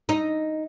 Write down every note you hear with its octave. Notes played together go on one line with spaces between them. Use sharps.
D#4